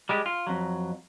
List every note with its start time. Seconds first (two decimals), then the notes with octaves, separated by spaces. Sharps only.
0.09 G3 G#3 G4
0.26 F4
0.47 F2 F#3